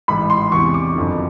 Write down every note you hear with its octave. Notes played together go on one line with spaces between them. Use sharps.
A1 G#2 E3 G#3 B5
C6
E2 C3 E3 C#6
D6
F#1 F2 D3